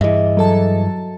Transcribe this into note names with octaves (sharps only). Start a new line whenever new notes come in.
G2 E3 G#4 D#5 E5
F#3 A4 A5